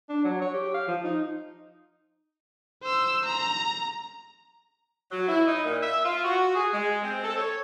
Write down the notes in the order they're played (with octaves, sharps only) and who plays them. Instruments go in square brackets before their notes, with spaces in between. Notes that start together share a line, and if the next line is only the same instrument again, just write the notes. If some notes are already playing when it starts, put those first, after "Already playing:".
[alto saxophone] D4
F#3
C#5
G4
F5
F3
D#4
[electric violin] C5 E6
A#5
[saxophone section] F#3
E4
D#4
A#2
E5
F4
F#4
G#4
G#3
C4
A4
C#5